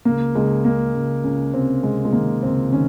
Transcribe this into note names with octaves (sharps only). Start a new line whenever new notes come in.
C#2 A#3
C#2 G#3
C#2 A#3
C#2
C#2 C#4
C3 C4
C3 G#3
G#3
D#3 A#3
C#2 C4
D#3 C#4